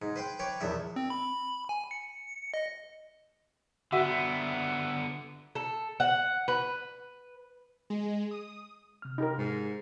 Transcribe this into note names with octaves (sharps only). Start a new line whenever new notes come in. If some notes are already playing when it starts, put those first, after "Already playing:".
G#2
B4 C5 G5
B4 C#5 D5 G5
A#1 E2 E5
C4
B5
G#5
C#7
D#5
D3 B3 F#4 E5
A4
F#5
B4
G#3
D#6
C3 F6
D#4 G4 A#4
G#2